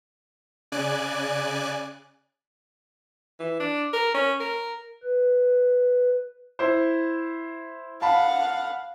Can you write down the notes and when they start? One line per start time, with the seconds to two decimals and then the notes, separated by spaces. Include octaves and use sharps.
0.72 C#3 D5 G#5 F#6
3.40 E3
3.60 D4
3.93 A#4
4.14 C#4
4.40 A#4
5.03 B4
6.59 E4 C5
8.02 F5 F#5 A5 B5